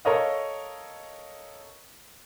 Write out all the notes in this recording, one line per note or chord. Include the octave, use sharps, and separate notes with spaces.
A4 A#4 C#5 D#5 F5